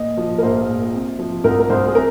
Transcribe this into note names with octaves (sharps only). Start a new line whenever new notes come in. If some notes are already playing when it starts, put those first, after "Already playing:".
Already playing: A#2 D#5
F3
A#4
A#1 C5
A#1
C3
F3
C2 A#4
A#4
C2 C5
G#4
C3 A#4